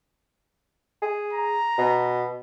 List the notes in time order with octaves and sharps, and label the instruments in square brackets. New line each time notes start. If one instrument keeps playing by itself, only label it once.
[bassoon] G#4
[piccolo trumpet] A#5
[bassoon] B2